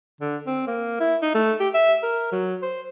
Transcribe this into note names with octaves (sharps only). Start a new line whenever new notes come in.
D3
C4
A#3
E4
D#4
A3
G4
E5
A#4
F#3
C5